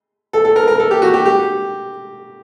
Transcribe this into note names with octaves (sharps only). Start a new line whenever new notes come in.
A4
A4
A#4
A#4
A4
G4
F#4
G4
G4